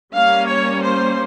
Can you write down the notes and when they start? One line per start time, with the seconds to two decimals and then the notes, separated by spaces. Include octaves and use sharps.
0.13 G3 A#3 C#4 F5
0.48 C#5
0.82 C5